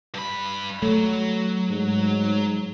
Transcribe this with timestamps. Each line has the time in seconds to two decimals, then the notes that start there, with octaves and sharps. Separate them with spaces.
0.14 G2 B5
0.82 F#3 A3
1.70 G#2